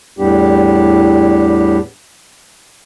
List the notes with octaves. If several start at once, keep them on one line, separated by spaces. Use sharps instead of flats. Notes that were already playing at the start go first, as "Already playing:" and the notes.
E2 A2 G3 B3 D4 G4